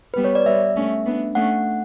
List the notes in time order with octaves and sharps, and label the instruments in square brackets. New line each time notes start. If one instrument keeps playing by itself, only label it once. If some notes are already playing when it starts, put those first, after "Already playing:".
[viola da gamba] G3 B3 [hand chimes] B4
[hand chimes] C#5
D5
[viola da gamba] G3 B3 [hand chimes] E5
[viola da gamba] A3 C#4
B3 D4
[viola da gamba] A3 C#4 [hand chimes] F#5